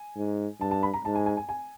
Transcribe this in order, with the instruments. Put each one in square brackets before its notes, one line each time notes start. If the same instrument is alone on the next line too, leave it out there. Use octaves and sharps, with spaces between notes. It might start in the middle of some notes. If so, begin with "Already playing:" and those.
Already playing: [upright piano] G#5
[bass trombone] G#2
[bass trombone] G2 [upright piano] A5
[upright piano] A5
B5
A#5
[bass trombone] G#2 [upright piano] A5
[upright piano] G#5
G#5
G#5
G#5